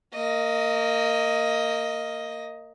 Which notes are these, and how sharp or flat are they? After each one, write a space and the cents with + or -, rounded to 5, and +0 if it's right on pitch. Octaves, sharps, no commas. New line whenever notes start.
A#3 -15 D#5 +10